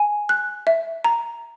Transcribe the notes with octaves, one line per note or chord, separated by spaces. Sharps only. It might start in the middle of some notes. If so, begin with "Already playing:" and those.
Already playing: G#5
F#6
E5
A#5